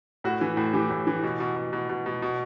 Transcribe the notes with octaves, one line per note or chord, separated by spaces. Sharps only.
A2 F#4
E3
A2
E3 G4
A2
E3
B2
B2
B2
B2
B2
B2
B2